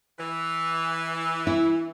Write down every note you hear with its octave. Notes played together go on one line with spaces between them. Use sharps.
E3
E4